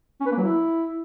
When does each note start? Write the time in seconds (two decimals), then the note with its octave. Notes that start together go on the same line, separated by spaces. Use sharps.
0.20 C#4
0.26 B4
0.32 A#3
0.37 F#3
0.43 E4